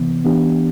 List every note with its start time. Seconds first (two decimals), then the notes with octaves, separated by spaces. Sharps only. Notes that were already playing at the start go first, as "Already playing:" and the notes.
Already playing: C3 E3 B3
0.25 E3 B3 D4 G4